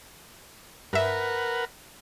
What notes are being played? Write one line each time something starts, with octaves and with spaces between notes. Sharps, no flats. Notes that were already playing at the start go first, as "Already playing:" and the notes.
G2 A#4 B4 E5 F#5